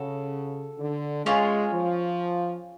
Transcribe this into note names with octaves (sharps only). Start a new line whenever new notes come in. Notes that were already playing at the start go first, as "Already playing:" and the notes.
Already playing: C#3 F#4 A4
D3
G#3 C#4 F4 G#4 C#5
F3